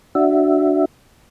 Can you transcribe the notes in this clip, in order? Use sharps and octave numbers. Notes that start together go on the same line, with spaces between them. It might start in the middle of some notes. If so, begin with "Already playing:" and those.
D4 F#4 E5